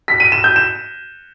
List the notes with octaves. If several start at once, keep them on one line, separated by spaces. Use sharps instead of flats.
B6
D#7
E7
G6
E7